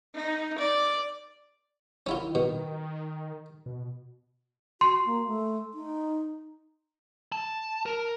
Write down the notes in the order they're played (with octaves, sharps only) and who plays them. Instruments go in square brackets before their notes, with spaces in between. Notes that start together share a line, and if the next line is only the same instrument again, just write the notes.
[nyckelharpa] D#4
D5
[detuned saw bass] D#3 [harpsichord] C#4 E4 F4
[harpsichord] B2
[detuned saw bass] B2
[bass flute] F#4 [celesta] C6
[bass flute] A#3
A3
D#4
[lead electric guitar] A5
A#4